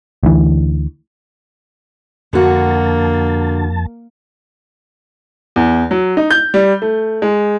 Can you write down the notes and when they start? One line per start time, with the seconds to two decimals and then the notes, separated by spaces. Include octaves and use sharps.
0.23 D2 E3
2.33 F2 D3 A#3 F#4 A5
5.56 E2
5.91 F#3
6.17 D#4
6.31 G6
6.54 G3
6.82 A3
7.22 G#3